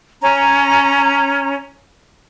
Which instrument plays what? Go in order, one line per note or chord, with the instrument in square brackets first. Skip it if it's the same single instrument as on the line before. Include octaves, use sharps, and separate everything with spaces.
[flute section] C#4 A#5